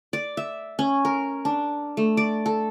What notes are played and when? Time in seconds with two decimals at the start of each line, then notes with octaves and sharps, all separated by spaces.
0.13 D5
0.37 E5
0.79 C#4
1.05 A#4
1.45 D4
1.97 A3
2.17 D5
2.46 A4